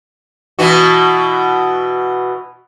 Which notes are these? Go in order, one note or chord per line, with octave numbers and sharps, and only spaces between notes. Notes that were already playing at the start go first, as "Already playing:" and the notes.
B2 E3 F#4